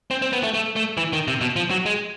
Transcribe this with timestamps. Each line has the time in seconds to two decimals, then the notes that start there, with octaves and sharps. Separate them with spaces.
0.11 C4
0.22 C4
0.33 B3
0.43 A3
0.54 A3
0.76 A3
0.97 E3
1.13 D#3
1.28 C3
1.41 B2
1.56 F3
1.71 F#3
1.86 G#3